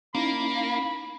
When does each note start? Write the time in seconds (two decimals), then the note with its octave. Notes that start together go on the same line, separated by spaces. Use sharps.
0.15 A#3 C#4 D#4 E4 B5